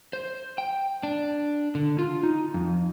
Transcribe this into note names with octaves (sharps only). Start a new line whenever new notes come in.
C5
G5
D4
D3
F4
D#4
F2